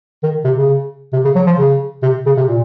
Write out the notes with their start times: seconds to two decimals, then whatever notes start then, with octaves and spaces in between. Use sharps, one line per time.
0.23 D#3
0.44 C3
0.56 C#3
1.13 C3
1.24 C#3
1.35 F#3
1.46 F3
1.58 C#3
2.03 C3
2.26 C#3
2.37 C3
2.48 A#2